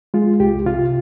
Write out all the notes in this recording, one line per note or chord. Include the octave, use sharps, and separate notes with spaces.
G#3 F4
C2 G4
C3 F4